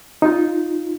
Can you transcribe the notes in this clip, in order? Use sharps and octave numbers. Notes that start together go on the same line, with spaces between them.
D#4 F4